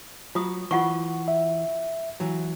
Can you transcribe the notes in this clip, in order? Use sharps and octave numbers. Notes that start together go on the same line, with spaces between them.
F#3 F4 D#6
E3 F4 F#5 C#6
E5
E3 F#3